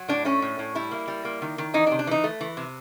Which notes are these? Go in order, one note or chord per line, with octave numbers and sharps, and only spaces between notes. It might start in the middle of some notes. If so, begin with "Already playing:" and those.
Already playing: F#3
A2 D4
A3 C#4
A2
A2
G3 E4
A#3
G3
A#3
D#3
D#3
E3 D#4
D4
C3
D4
E3 D#4
A3
E3
C3